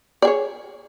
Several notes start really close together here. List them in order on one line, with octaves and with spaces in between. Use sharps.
D5 G#4 C#5